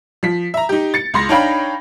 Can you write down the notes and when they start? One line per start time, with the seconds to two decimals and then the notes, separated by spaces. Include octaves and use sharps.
0.23 F3 B6
0.54 E5 A#5
0.69 D#4 G4
0.94 A6 C#7
1.14 C#2 C6 A#6
1.29 D4 D#4 C#5 F5 G5 B5